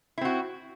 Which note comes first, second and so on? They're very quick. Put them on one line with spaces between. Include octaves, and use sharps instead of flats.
E4 C4 F#4